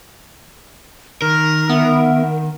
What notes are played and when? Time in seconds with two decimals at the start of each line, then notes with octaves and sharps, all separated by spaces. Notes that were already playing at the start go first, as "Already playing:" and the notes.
1.22 D#3 A#4 F6
1.69 B3 E5